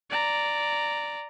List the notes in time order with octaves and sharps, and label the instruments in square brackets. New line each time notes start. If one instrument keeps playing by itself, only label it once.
[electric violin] D5 A#5